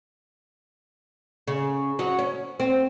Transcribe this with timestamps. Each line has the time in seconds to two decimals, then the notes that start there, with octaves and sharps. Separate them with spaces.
1.48 C#3
1.99 F#3
2.19 C#4
2.60 C4